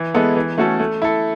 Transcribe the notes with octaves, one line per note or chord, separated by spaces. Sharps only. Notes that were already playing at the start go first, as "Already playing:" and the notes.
Already playing: E3
G#3 B3 E4 A4
E3
A3 C#4 F#4 A4
A3
E4 A4